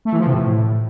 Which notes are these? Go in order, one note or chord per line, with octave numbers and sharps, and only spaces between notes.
A3
E3
F3
C3
A2